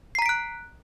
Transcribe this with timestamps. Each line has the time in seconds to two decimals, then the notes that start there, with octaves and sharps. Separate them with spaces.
0.15 C7
0.19 A#5
0.22 B6
0.26 D7
0.29 F#6